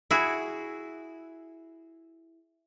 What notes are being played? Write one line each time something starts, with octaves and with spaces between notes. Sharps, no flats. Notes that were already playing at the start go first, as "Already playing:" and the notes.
E4 F#4 G#4